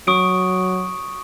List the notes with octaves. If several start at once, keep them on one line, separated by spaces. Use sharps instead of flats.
F#3 C#6 D#6 D7